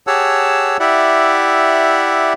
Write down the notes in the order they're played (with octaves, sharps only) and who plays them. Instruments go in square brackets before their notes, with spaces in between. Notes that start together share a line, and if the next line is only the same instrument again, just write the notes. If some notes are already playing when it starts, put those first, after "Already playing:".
[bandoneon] G4 G#4 C#5 F#5 A5 E6
E4 G4 D5 E5 F#5